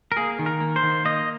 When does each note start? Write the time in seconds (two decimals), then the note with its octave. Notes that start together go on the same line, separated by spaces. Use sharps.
0.12 A#4
0.17 A#3 G#4
0.39 D#3
0.46 A#4
0.60 A#3
0.76 C5
0.83 D#3
1.05 A#3 D#5